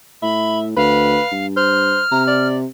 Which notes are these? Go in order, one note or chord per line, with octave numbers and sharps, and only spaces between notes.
A2 E5 B5
D2 B4 F5
G2
C5 F6
C3 A#5
D5